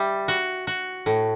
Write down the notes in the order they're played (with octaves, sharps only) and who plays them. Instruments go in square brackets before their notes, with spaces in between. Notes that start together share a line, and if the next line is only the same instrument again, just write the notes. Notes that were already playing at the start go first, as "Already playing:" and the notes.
Already playing: [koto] G3 [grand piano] E5
[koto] F#4
F#4
A2